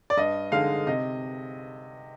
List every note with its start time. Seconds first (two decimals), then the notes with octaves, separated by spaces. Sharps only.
0.10 D5
0.17 G2 D#5
0.52 D3 G#3 D#4 F5
0.87 C3 D#5